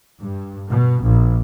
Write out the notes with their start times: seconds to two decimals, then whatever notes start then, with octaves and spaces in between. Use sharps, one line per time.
0.20 G2
0.70 B2
1.03 A#1